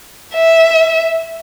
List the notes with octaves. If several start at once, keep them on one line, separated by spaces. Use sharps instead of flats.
E5